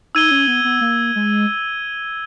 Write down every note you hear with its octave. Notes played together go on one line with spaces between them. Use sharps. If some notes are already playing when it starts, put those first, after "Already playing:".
D#4 E6 G#6 D#7 G7
C#4
B3
B3
A#3
G#3